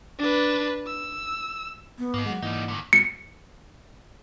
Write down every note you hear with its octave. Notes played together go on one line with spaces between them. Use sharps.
D4 B4
E6
B3
G#2 A#3 D#4
F#3 G#3 F#5
G#2 E3 G3 A#3 D#4
D3 D#3
C#7